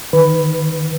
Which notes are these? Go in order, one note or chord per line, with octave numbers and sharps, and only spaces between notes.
D#3 B4